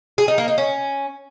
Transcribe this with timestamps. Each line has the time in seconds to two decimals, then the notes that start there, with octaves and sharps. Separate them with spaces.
0.18 G#4
0.28 D#4
0.38 A#3
0.48 D#4
0.58 C#4